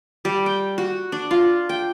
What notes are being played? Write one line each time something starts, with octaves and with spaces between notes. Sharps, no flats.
G3
G5
F#4
D4
F4
G5